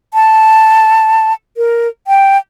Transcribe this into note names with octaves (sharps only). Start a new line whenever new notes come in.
A5
A#4
G5